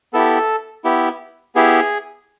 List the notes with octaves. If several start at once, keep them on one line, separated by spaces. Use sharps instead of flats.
B3 E4 G4 A4
B3 E4 G4
B3 E4 G4 G#4